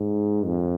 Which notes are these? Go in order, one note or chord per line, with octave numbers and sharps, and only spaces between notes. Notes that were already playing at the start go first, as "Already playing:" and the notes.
Already playing: G#2
F2